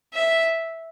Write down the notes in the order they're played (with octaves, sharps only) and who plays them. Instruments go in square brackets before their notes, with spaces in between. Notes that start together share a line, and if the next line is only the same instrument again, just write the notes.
[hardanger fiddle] E5